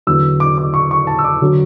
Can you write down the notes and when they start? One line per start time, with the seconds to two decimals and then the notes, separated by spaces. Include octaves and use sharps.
0.07 E2 D3 F#3 E6
0.40 D6
0.58 D6
0.74 C#6
0.91 C#6
1.07 A5
1.19 E6
1.24 D6
1.42 D3 F#3